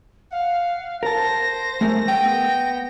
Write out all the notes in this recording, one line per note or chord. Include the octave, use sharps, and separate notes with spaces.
F5 F#5
A#4 A5 A#6
C5
A3 G#4 A#4
B3 G5